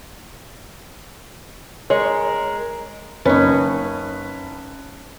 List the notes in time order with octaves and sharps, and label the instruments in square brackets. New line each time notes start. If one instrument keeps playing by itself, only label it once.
[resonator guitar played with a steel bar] G#3 [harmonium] A#4 [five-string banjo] C#5
[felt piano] F#1 B4 [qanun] C#4 D#4